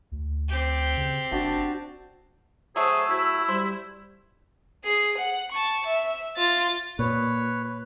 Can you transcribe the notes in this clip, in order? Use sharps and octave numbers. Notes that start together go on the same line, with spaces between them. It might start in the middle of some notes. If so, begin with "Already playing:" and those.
D2
C4 G4
C#3
F#1 D4 F#4 A5
F#3 A3 G#4 C5 E6
E4 F#4
G3 C5
G#4 C7
F#5
A5 C#6
E5
F4 A6
A#2 B4 C#5
B4